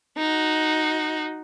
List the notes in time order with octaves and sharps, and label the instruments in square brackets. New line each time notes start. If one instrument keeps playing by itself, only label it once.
[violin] D#4 F#4